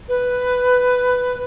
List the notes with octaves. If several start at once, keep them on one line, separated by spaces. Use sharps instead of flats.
B4